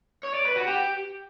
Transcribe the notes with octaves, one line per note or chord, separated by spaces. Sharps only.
C#5
D5
B4
F#4
G4